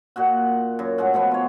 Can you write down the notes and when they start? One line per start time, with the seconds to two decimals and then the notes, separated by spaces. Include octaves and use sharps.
0.16 A#2 F#4 F#5
0.79 F#2
0.98 A2 G#3 F#5
1.14 B2 F3 B3
1.31 F4 C#5